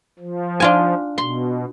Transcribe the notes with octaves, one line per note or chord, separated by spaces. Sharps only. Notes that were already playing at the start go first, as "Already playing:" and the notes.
F3
D4 F4 G#5
B2 C6